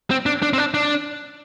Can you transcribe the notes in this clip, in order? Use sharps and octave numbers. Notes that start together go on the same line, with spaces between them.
C4
D4
D4
C4
D4
D4